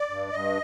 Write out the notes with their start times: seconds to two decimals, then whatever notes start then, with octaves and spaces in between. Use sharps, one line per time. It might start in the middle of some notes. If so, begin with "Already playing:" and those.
Already playing: D5
0.10 G2
0.32 G2 D#5